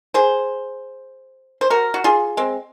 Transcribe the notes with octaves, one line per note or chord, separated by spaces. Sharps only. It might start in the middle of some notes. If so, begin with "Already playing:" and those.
G#4 C5
C5
F#4 A#4
F#4
F4 G#4
G#3 C4